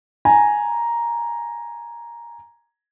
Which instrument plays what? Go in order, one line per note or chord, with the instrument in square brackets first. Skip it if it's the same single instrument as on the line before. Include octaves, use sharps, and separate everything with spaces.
[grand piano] G#5 A#5